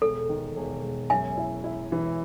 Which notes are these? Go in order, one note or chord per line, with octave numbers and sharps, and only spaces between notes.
E1 A4
D#3
E1
E1
F#2 E5 G#5
E4
E4
E3